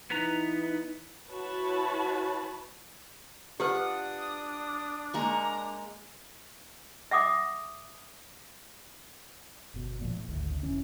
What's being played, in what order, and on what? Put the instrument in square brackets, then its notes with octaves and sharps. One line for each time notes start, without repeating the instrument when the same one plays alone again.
[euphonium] E3 [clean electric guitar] B3 B4 A#5 [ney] D#4
[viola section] E4 F#4 B4 C#5 A5 B5
[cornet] D4 [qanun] F4 F#5 [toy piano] G4 B4 [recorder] D#6
[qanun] G#3 A#3 C#6 [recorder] A#5
[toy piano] E5 F#5 D6 D#6
[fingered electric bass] G1 B2
A#2 F3
A2
G#1 D2 A2
D2 C3
F1 E3 C#4